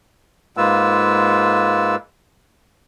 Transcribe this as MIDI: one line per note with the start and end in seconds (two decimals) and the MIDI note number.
0.57 1.96 44
0.57 1.96 56
0.57 1.96 58
0.57 1.96 65
0.57 1.96 71
0.57 1.96 88